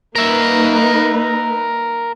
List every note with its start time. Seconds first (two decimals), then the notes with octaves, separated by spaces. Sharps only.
0.16 A#3 D#4 A#4 B4 E5